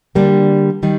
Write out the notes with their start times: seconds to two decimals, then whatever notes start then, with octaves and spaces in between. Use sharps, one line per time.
0.15 D3 G3 A#3 D4 G4
0.83 D#3 G3